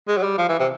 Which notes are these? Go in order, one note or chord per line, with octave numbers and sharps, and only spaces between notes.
G#3
F#3
G3
F3
E3
C3